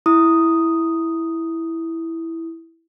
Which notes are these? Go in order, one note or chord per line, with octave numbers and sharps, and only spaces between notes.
E4 D#6